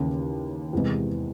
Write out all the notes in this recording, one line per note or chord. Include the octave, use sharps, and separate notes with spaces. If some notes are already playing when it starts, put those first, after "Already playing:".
Already playing: D#2 C#3 E3
E2 C3 E3 G#3